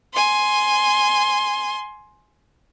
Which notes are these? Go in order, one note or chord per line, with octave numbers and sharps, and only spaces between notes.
G#5 C6